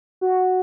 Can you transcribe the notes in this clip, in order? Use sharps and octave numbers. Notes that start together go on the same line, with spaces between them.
F#4